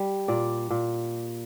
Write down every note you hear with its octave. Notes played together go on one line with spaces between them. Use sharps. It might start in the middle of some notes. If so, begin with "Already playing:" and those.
Already playing: G3
A#2 D5
A#2